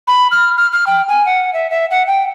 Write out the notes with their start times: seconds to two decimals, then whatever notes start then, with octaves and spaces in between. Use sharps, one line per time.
0.07 B5
0.31 F6
0.57 F6
0.72 F6
0.87 G5
1.08 G#5
1.26 F#5
1.54 E5
1.70 E5
1.91 F#5
2.07 G5